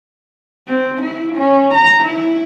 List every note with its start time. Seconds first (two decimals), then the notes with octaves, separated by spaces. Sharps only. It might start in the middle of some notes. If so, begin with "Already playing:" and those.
0.67 C4
1.02 E4
1.36 C#4
1.74 A#5
2.04 E4